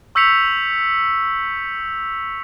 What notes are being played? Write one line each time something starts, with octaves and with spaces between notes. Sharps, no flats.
C#6 E6 G6 B6 C#7 F7